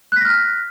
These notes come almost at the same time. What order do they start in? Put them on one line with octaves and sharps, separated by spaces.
F#6 B6 A#6 F6